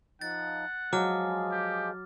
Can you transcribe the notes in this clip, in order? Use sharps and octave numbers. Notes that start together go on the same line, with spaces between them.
F3 D#4 F#5 A6
F3 F#3 G#3 G#4 D6 F6
G4